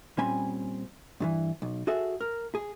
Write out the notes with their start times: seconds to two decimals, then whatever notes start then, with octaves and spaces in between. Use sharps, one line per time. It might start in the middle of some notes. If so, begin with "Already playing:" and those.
0.18 A#2 G3 C4 C#4 G#5 B5
1.20 G2 D#3 E3
1.62 B1
1.87 F#4 G#4 A4 E5
2.21 A#4
2.55 G#4